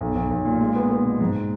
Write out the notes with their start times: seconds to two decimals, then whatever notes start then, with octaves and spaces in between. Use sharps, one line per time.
0.01 B1
0.15 B1
0.31 B1
0.45 A#2
0.60 G#3
0.76 B3
0.90 B3
1.05 B2
1.21 G#2